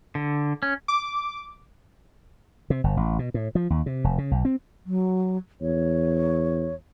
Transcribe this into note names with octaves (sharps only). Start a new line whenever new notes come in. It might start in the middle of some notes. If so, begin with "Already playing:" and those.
D3
C#4
D6
C3
G1
A1
B2
A2
F3
D#2
C3
F1
C#3
B1
C4
F#3
E2 C#5